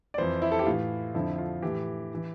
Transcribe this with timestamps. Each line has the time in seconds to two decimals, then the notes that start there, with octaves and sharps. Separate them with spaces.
0.14 D5
0.18 F2 E3 C5
0.42 E4
0.52 A4
0.59 G4
0.66 A2 E3 F4
1.14 F2 D3 F3 E4
1.38 F4
1.62 A2 E3 G4
2.15 E3